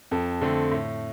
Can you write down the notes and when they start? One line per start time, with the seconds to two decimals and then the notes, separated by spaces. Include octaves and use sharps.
0.11 F2 A4
0.41 D3 A3 C4
0.71 A2